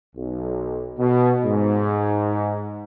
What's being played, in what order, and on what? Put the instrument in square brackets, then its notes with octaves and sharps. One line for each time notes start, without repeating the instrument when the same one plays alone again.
[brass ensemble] B1
B2
G#2